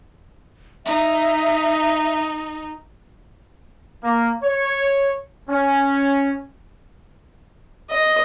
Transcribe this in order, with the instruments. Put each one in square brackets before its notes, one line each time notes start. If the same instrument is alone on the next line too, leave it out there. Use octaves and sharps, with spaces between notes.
[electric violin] D#4 [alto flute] E5
[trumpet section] A#3
C#5
C#4
[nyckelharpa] D#5